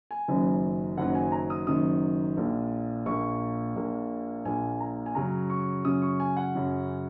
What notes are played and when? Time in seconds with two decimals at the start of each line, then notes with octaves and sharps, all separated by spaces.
0.11 G#5
0.28 F#1 F#2 D#3 F#3
0.97 F#1 F#2 D#3 F#3 F#5
1.15 G#5
1.32 A#5
1.50 D#6
1.67 F#1 F#2 D#3 F#3 D#6
2.37 A#1 A#2 A#3
3.06 A#1 A#2 A#3 C#6
3.76 A#1 A#2 A#3
4.45 A#1 A#2 A#3 G#5
4.80 A#5
5.06 G#5
5.15 F#2 C#3 F#3 C#4 A#5
5.50 C#6
5.85 F#2 C#3 F#3 C#4 D#6
6.02 C#6
6.20 G#5
6.37 F#5
6.55 F#2 C#3 F#3 C#4